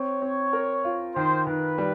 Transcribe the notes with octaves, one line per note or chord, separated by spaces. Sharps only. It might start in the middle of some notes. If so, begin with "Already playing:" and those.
Already playing: C4 C#5
C4
A#4
F4
D#3 C5
D#3 B4
G3